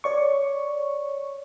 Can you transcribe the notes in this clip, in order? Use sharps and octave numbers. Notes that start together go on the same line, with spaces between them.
C#5 D5 C#6